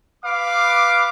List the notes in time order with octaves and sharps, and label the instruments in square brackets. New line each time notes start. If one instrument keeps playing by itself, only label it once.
[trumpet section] B4 F5 D6